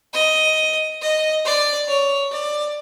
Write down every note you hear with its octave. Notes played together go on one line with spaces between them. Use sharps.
D#5
D#5
D5
C#5
D5